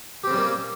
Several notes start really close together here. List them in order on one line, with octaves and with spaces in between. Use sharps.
G4 C4 C#3 G3 A#3